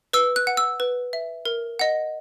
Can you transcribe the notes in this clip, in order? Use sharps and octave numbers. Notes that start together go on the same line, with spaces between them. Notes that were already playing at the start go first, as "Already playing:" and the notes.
B4 E6
F#6
F#5
E6
B4
E5
A#4
D#5 F#5